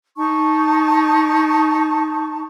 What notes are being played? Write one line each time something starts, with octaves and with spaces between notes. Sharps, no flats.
D#4 A5 C#6